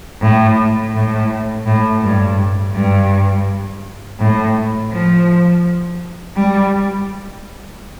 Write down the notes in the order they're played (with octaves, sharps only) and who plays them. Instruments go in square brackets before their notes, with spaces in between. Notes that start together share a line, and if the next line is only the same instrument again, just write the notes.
[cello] A2
A2
A2
G2
G2
A2
F3
G3